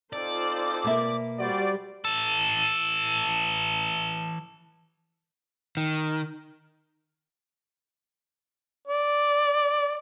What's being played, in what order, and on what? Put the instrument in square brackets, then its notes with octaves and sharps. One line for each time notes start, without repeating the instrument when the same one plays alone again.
[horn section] C4 D#4 A4 [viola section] F4 C5 [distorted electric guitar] D5
[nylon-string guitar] B2 A#3 E5
[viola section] G3 [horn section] F#4 C5 D5
[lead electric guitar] E3 A4
[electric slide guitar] D#3
[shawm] D5